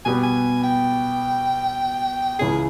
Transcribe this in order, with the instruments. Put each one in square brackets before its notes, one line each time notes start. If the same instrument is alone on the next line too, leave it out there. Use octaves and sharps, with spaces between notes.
[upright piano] B2 G3 B3 G4 B4 [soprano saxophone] G#5
[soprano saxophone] G#5
G5
[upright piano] C#2 C#3 E3 [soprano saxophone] G#4